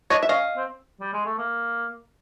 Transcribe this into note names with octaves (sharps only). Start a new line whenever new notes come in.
D4 C#5 D#5
E5
C#4 D#5 F5
C4
G3
G#3
A3
A#3